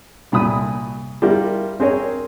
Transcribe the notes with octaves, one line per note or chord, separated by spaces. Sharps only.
C2 A#2 B5 D#6
G3 E4 F4 A#4
C4 G#4 A#4 C#5